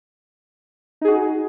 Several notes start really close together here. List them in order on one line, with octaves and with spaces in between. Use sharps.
D#4 G#4 F#4